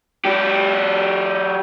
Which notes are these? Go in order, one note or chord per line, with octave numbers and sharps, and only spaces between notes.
F#3 G4